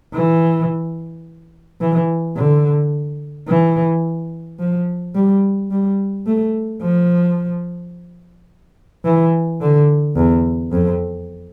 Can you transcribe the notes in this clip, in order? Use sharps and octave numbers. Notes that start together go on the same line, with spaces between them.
E3
E3
D3
E3
F3
G3
G3
A3
F3
E3
D3
E2
F2